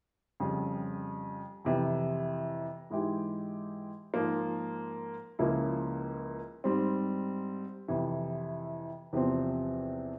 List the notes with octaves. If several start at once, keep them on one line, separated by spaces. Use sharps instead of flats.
F2 C#3 G3
F2 C3 E3
G#2 E3 G#3 E4 G4
G#2 F3 A#3
C#2 C#3 F3 A#3 E4
G#2 G3 C4
F2 C3 E3
E2 C3 F3 C4